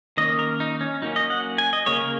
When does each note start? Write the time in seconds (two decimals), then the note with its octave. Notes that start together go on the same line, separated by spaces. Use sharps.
0.17 D#3 A#3 C#4 D#5
0.39 A#4
0.60 D#4
0.81 C#4
1.02 F#3 A#3 C#4 D#4
1.16 D#5
1.30 F#5
1.58 G#5
1.73 D#5
1.86 C#3 A#3 C#4 C#5
2.00 A#4